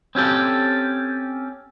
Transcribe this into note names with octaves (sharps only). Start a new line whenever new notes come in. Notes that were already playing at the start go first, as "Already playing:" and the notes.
C4 C#4 G4 A4